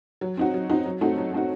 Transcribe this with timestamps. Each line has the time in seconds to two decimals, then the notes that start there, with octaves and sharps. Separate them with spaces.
0.21 F#3
0.37 C4 D#4 F#4
0.54 F#3
0.70 C4 D#4 F#4
0.86 F#3
1.01 A3 C4 D#4 F#4
1.18 F#3
1.34 A3 C4 D#4 F#4